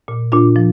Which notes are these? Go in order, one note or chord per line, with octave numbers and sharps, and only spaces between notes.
A#2
A#2 D4 F4
F3